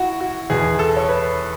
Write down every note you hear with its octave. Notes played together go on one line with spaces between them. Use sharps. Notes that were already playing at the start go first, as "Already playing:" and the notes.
Already playing: E4 F#4
F#4
E2 B2 G#4
A4
C#5
B4